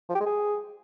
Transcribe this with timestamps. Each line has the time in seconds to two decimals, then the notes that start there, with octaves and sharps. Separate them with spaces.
0.09 F3
0.15 G4
0.20 G#3
0.26 G#4